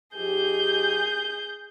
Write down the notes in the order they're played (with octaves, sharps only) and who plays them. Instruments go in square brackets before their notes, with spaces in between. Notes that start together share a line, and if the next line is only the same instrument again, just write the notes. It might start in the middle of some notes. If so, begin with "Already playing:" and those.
[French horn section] F3 D#4 G4 [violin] G#4 G6